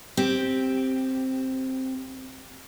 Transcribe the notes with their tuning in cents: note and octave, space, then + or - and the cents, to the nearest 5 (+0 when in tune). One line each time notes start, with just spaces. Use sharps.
C4 +5 G4 +0